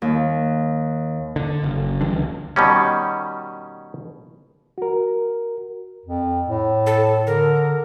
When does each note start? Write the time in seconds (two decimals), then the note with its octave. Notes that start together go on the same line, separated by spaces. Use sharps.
0.02 D#2
1.36 D3
1.63 F#1
2.01 D3 E3 G3 D4
2.13 C#2
2.56 B2 D#3 G3 C#4
4.78 F#4 A#4
6.06 F2
6.48 A2
6.86 A4
7.27 D3 A#4